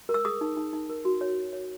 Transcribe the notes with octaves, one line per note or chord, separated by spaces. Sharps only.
A#4
E6
G#4 D#6
D#4
D#4
D#4
A#4
F#4
C#5
F#4
C#5